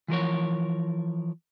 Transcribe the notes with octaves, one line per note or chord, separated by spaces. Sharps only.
E3 F3 A#4 C#5